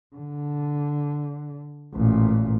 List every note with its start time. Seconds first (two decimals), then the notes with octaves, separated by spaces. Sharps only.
0.16 D3
1.94 A1 A#2